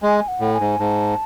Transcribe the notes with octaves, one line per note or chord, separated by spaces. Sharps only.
G#3 G#5
F#5
A2
G#5
G#2
G#2 A5